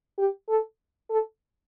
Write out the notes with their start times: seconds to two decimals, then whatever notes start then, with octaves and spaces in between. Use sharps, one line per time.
0.18 G4
0.49 A4
1.10 A4